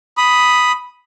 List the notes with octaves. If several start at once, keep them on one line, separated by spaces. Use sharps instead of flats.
B5 D#6